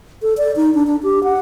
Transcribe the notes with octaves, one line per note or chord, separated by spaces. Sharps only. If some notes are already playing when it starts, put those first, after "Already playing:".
A4
D5
D#4
D4
D4
G4
F#5